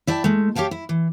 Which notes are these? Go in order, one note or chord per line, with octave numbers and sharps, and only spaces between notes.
E4 D5 G5 A5
G#3 A3
G4 C#5 F5 G5 A5
E4
E3